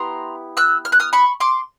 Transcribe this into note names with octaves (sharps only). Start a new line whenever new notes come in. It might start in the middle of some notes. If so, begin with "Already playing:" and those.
Already playing: B3 E4 G4 A#5 C6
E6 F#6
F6
F#6
D#6 F6
B5 C#6
C6 D6